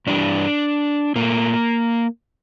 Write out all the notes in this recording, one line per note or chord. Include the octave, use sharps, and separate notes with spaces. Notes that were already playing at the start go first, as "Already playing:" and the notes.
G2 E3 G3 D4
A#2 A3 A#3